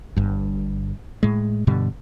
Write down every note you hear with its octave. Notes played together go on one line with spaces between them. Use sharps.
G1 G2
A2 G#3
G2 B2 D3 G3